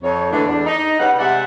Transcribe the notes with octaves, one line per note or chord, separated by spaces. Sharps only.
F2 C#5
A2 D3 E3 G#3 A3 D4
E2 D4
D#4
C#3 G3 B3 F#5
C3 G#3 D5 E5 F#5